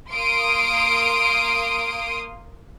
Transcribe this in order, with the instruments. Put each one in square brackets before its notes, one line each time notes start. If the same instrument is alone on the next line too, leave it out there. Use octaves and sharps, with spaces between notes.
[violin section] A#3 F5 C6 D#6 D7